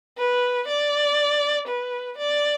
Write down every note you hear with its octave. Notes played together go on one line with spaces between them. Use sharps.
B4
D5
B4
D5